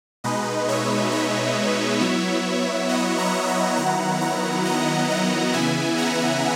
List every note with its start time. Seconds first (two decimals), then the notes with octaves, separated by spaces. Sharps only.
0.24 B2 G#3 D#4 B4 D#5
0.68 C#5 E5
1.12 C#5 E5
2.01 F#3 B3 E4
2.89 D#5 F#5
3.18 F#5 A#5
3.48 F#5 A#5
3.77 D#3 F#3 B3 E4 F#5 A#5
4.21 F#5 A#5
4.65 D#5 F#5
5.09 D#5 F#5
5.53 C#3 E3 B3 E4 E5 G#5
5.97 F#5 A#5